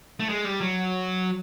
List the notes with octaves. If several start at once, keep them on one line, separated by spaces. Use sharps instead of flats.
A3
G#3
G3
F#3